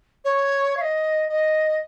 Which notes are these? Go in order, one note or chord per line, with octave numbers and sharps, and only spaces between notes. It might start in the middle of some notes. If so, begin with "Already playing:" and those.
C#5
F5
D#5
D#5